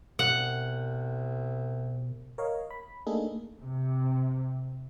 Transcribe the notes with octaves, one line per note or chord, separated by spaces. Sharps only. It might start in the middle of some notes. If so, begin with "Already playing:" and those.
C2 B2 F#5
A#4 C#5 D#5 F5
B5
A3 A#3 D4 D#4 G#4 A4
C3